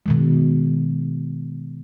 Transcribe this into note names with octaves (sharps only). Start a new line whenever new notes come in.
B2 D#3 G#3